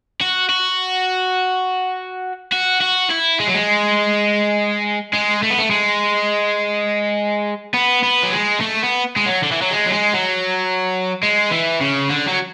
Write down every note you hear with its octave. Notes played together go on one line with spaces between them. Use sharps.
F#4
F#4
F#4
F#4
E4
G#3
F#3
G#3
G#3
A3
B3
A3
G#3
B3
B3
F#3
G#3
A3
B3
G#3
F#3
D3
E3
F#3
G#3
F#3
G#3
F#3
G#3
E3
C#3
D3
F#3